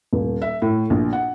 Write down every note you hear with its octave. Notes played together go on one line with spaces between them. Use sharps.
D#1
E5
A2
A#1
F#5